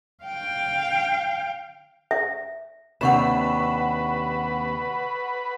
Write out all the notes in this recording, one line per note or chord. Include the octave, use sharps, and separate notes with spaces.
F5 G5
E5
D#2 C3 D4 B4 F#5 C#6 E7